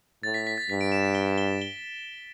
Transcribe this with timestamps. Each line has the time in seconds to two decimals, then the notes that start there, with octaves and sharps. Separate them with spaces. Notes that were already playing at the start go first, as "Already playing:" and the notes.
0.23 A2 A6
0.34 B6
0.47 B6
0.58 A6
0.70 G2 B6
0.81 D7
0.92 E7
1.15 G7
1.38 G7
1.62 G7